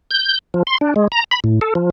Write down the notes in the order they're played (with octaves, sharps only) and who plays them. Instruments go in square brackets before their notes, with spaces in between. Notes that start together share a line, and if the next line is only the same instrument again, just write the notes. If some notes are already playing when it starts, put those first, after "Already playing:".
[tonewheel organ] G6
F3
C6
D4
G#3
A#5
B5
A2
A4
F3